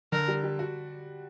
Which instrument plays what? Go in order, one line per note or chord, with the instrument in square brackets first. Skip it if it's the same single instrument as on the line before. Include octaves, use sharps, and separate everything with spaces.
[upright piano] D3 [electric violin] A#4
[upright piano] G3
G3
F#4